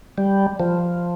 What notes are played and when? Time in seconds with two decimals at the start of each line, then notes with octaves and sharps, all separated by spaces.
0.18 G3
0.60 F3